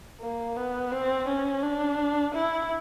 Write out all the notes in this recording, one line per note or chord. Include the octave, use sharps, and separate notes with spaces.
A#3
B3
C4
C#4
D4
E4